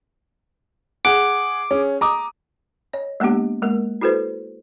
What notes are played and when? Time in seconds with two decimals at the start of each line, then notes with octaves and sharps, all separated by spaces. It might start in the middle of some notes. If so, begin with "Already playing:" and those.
1.05 G#4 F#5 D6
1.71 C#4 G#4
2.01 A#5 D6 D#6
2.93 C#5 D#5
3.20 G#3 A#3 B3 D4 G4
3.62 G#3 A#3 A#4
4.01 E4 F#4 A4 B4 C5